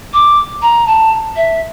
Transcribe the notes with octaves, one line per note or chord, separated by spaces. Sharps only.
D6
A#5
A5
E5